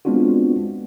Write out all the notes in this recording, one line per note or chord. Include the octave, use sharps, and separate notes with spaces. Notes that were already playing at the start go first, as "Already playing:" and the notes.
G#3 B3 C4 D4 F4 F#4